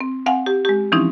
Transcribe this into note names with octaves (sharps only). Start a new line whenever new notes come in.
C4
C4 F5 F#5 G#5
G4
G#3 G4
E3 F3 C4 C#4 D#4 E4